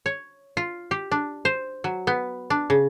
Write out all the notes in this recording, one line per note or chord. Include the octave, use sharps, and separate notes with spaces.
C#5
F4
G4
D4
C5
F#3
B3
D4
C#3